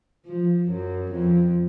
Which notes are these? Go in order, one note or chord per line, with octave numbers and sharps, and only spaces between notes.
F3
F#2
F2